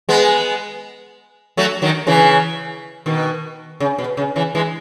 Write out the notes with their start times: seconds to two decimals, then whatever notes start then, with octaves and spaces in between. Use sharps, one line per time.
0.09 G#3 B3
1.57 F#3 A3
1.82 D#3 F#3
2.07 C#3 E3
3.06 B2 D#3
3.80 C#3
3.98 B2
4.17 C#3
4.36 C#3 E3
4.55 E3 G#3